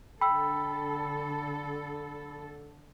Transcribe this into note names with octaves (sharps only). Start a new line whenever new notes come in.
D3 A4 G5 B5 E6